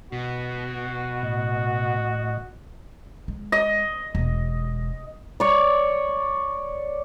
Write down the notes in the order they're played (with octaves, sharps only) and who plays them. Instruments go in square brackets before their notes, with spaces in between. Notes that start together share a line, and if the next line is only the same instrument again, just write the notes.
[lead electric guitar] B2 [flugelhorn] F#4
[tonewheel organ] A2 D#5
[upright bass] G#3
[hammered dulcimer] D#5
[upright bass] E1
[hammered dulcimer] C#5 D5